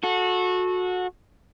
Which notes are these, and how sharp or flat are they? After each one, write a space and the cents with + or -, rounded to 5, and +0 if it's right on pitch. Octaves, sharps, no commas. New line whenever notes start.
F#4 -25 A4 -15